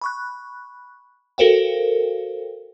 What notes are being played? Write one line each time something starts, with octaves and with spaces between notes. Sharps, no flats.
B5 C#6 F#6
F#4 A4 A#4 C5 F5 G5